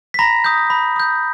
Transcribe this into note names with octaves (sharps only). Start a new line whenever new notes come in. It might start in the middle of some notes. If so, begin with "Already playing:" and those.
B6
A#5 B5 A#6
D#6 G6
B5
D#6 G6